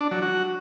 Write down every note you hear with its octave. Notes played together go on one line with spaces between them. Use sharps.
D4
F#3
F#4